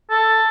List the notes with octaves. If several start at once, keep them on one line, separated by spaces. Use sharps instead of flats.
A4